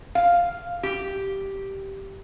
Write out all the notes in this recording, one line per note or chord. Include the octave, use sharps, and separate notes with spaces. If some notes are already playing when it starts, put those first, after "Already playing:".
F5
G4